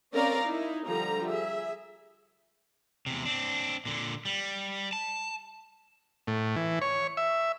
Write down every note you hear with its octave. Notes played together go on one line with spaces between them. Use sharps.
C4 C#4 A#4 D5 F5 A#5
D#4 E4
D3 F3 G3 A#5
G#4 E5
E2 C3
C4 D4
A#2 D3
G3
A5
A2
E3
C#5
E5